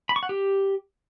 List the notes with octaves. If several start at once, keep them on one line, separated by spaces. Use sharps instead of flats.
B5
C#6
F#5
G4